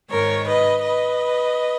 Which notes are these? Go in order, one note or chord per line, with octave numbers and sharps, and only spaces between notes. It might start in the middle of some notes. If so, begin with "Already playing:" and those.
G#2 D#3 A#4 C#5
B4 D#5
B4 D#5